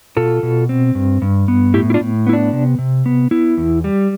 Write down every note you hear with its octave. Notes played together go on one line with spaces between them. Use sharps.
B2 F4 A4
B2
C4
G2
G2
B3
A2 E4 G4
E4
D4 F4
A2
B3 E4
D4
C3
C3
B3
B3 E4
E2
G3